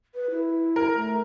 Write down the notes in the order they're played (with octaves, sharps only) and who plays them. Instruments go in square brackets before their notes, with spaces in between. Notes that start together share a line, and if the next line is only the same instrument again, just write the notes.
[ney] B4
E4
[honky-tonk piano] A#4
[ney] A3